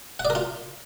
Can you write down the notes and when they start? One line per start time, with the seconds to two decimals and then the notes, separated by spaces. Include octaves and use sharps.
0.19 F#5
0.25 D5
0.30 A#4
0.35 F4